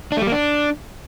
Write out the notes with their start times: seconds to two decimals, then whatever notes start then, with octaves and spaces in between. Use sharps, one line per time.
0.12 D4
0.17 A3
0.22 G3
0.27 A#3
0.32 D4